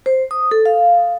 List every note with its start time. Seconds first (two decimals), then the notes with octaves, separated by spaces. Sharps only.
0.06 C5
0.31 D#6
0.51 A4
0.66 F5